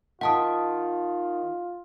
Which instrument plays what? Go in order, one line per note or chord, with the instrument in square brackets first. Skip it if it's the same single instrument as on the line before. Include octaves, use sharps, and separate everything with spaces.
[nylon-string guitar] D#3 [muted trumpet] F4 [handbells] F#5 A5 D#6